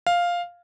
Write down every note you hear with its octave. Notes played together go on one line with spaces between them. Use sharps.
F5